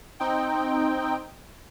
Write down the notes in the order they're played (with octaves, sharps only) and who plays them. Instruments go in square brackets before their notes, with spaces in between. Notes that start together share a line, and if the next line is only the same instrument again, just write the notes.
[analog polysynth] C4 D#4 G5